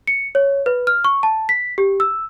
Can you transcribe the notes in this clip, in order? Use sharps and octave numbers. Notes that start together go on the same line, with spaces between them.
C#7
C#5
B4
F6
C#6
A5
B6
G4
E6